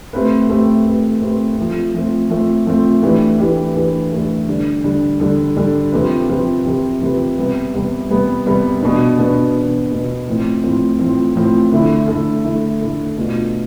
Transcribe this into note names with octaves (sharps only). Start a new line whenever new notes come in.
A3 C4 G4 B4
A3 C4 G4 B4
A3 C4 G4 B4
A3 C4 G4 B4
F3 A3 C4
F3 A3 C4
F3 A3 C4
F3 A3 C4
E3 A3 D4 G4 B4
E3 A3 D4 G4 B4
E3 A3 D4 G4 B4
E3 A3 D4 G4 B4
D3 G3 D4 A4
D3 G3 D4 A4
D3 G3 D4 A4
D3 G3 D4 A4
C3 F3 C4 G4 B4
C3 F3 C4 G4 B4
C3 F3 C4 G4 B4
C3 F3 C4 G4 B4
C3 G3 B3
C3 G3 B3
C3 G3 B3
C3 G3 B3
B2 B3 D4
B2 B3 D4
B2 B3 D4
B2 B3 D4
A2 F3 C4
A2 F3 C4
A2 F3 C4
A2 F3 C4
D3 A3 E4 A4
D3 A3 E4 A4
D3 A3 E4 A4
D3 A3 E4 A4
B2 A3 D4 F4